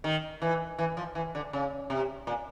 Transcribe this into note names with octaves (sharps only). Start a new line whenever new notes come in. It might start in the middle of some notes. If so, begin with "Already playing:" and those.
D#3
E3
E3
F3
E3
D3
C#3
C3
A#2